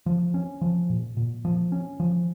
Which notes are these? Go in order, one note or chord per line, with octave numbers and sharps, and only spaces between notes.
F3
C#4
F3
A#2
A#2
F3
C#4
F3